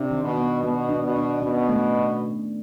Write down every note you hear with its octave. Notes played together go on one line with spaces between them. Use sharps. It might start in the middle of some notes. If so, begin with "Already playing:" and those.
Already playing: C3 D4
D#3
B2
B3
B2 B3
D4
B2
D4
B2 C#4
A3